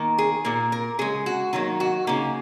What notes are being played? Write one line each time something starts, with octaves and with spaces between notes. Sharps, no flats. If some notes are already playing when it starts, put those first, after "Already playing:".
Already playing: D#3 A#3
G#4
A#2 A#3 A#4
A#4
C#3 G#3 G#4
F#4
D#3 F#3 A#3 D#4
F#4
C#3 A#3 D#4